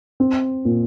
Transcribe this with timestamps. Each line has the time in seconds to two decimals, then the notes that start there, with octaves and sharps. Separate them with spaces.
0.20 C4
0.65 A#2